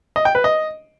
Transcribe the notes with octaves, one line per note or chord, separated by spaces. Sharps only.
D#5
G5
B4
D#5